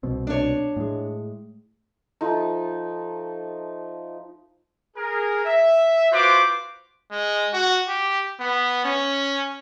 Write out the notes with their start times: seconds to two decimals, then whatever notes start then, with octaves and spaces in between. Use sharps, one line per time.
0.03 C2 B2 C4
0.27 D4 C#5
0.77 A2 G#3
2.21 F3 A3 D#4
4.97 G#4 A#4
5.45 E5
6.12 F4 F#4 B4 C5 B5 D6
7.12 G#3
7.53 F#4
7.89 G4
8.40 B3
8.85 C#4